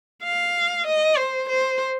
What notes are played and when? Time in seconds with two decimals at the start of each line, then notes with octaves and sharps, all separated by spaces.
0.23 F5
0.86 D#5
1.17 C5
1.49 C5